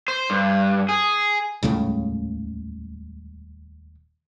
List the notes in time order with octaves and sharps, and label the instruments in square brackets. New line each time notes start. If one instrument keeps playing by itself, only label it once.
[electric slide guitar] C5
G2
G#4
[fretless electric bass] D#1 C#2 A2 C#3